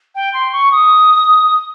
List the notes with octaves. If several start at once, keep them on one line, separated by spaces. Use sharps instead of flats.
G5
C6
C#6
D#6